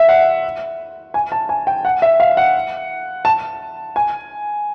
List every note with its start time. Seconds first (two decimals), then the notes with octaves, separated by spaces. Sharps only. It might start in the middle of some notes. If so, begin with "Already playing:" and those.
Already playing: E5
0.09 F#5
1.14 G#5
1.32 A5
1.49 G#5
1.67 G5
1.85 F#5
2.02 E5
2.20 F5
2.37 F#5
3.25 A5
3.96 G#5